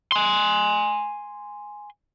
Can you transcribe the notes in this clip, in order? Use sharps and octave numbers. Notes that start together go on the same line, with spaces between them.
G#5 C6